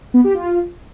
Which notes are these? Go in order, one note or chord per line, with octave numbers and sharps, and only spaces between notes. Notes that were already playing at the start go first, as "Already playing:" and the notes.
B3
G4
F4